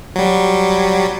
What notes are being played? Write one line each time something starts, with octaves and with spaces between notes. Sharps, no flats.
F#3 G3